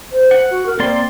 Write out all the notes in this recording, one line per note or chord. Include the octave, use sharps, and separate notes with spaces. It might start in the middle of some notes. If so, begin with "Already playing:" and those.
C5
F#5
F#4
A#4
A#3 C4 D5 C6